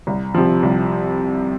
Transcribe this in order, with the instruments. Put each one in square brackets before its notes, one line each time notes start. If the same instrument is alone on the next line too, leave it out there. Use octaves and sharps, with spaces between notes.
[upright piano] C2
C3 F3
C2